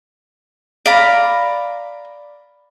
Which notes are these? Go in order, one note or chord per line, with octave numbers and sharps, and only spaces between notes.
D5 F5 A#5 B5